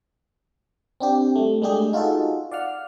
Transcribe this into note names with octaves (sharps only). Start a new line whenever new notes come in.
C4 D4 G4
G3 A3
G#3 A3 D4 G4 G#4
D#4 F4 F#4 G#4 A4
D5 F5 F#5 F6